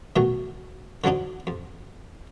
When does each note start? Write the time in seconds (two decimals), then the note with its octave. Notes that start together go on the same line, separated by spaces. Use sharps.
0.16 B2 D#3 F#3 A3
1.04 D3 F3 F#3 D4 D#4
1.47 F2